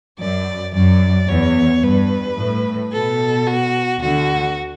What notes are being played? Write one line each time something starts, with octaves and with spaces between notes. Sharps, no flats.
F#2 D5
F#2 D5
E2 C#5
G2 B4
A2
B2 A4
F#4
D2 D3 F#4